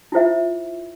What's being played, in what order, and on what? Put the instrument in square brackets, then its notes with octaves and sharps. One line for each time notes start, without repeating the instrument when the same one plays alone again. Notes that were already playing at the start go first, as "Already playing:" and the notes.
[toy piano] E4 F4 C5 E5